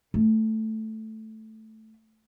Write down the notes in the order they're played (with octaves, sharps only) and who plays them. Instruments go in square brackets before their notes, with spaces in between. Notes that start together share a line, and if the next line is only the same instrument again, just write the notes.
[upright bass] A3